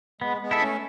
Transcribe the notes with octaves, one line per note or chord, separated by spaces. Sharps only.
G#3 B3
G#3 B3
E4 A4 E5
A3 C#4